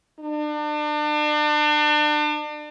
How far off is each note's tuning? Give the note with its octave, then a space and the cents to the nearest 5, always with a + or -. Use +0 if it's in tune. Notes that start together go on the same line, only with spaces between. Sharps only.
D4 +35